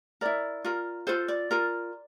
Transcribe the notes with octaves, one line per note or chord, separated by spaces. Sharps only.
E4 A#4 D5
F4 A#4
F4 A4 C5
D5
F4 A#4